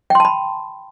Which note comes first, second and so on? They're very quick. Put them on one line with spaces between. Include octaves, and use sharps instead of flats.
G5 C6 A5 B5